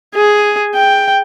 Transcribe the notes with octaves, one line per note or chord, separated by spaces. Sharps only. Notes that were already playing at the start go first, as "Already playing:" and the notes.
G#4
G5